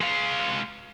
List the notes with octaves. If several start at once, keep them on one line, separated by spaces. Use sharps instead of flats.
G#3 F5